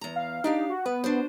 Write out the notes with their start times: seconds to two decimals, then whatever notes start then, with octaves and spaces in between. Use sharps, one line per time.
0.01 E2 A#5
0.16 F5
0.44 D4 D#4 G4 F5
0.70 F#4
0.86 B3 B4
1.04 D4 F#4 C5